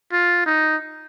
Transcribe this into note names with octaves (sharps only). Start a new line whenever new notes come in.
F4
D#4